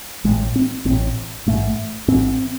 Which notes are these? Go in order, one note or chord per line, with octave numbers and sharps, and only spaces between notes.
A1 A2 G#3
C4
A1 C4
A2
A1 G#2 A3
A1 G#2 C4